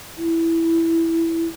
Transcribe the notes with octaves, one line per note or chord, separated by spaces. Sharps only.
E4